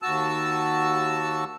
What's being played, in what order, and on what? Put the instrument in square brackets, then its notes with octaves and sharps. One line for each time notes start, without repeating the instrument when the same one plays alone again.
[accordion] D#2 F#4 A5 E6